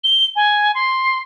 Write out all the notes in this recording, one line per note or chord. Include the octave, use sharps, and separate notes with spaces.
G7
G#5
C6